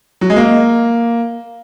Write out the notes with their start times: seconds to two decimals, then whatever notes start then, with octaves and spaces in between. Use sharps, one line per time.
0.21 F#3
0.30 G#3
0.36 A#3